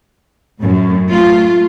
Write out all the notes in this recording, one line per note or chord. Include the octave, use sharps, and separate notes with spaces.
F#2 A2
A3 F4